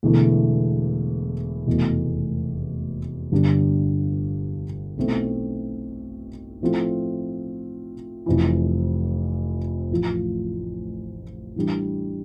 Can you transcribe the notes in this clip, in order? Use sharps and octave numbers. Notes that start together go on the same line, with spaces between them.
E1 E2 D3 A3 E4
F1 E2 B2 A3
G1 G2 D3 G3 D4
B1 B2 A3 C4 E4
A2 F3 A3 C4 F4
F1 F2 E3
A1 A2 F3
A2 E3 G3 D4